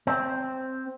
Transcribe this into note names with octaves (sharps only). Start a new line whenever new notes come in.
C4